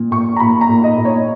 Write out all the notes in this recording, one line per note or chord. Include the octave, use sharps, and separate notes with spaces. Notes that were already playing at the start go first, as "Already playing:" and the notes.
Already playing: A#2
A#2 C#6
A#5
A#2 B5
A#5
A#2
D#5
A#2
C#5